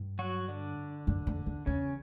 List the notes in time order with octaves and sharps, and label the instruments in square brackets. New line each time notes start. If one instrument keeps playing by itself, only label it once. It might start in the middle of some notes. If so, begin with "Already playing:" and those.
Already playing: [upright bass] G2
[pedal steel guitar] F#3 F#4
D3 D4
[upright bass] F#2
F2
E2
[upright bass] E2 [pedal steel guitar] C#3 C#4